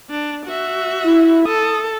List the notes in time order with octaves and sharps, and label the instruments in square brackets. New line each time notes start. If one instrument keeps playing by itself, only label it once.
[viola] D4
F#4 E5
[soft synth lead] E4
[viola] A4 [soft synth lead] D#6